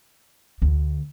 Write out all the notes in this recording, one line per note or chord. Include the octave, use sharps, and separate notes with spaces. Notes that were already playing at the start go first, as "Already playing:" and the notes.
D2